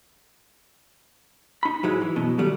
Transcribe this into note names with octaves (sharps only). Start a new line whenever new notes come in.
D#4 B5
G#2 F#3 G#3 E4
E3
F#2 B2
D#3 F#3 G3 A3